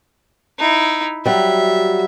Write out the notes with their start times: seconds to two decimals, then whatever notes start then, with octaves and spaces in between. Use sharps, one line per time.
0.58 D#4 E4
1.26 F#3 G3 E5